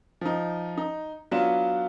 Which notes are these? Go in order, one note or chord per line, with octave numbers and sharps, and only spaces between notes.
F3 D#4
D#4
F#3 B3 D4 F4 E7